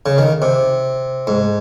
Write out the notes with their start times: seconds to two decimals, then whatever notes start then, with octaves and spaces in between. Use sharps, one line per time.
0.06 C#3
0.18 D#3
0.42 C3
1.27 G#2